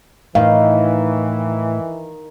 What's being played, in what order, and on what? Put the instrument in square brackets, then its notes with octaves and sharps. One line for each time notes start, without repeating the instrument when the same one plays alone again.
[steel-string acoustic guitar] A2 [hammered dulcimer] D#3 [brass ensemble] E3 [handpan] F5